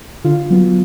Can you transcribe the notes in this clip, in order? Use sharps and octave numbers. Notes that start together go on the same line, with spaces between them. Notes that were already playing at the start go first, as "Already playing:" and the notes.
D3 F4
F#3 B3